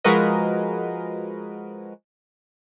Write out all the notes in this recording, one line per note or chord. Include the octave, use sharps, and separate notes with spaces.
F3 G#3 F#4 A#4 B4 D#5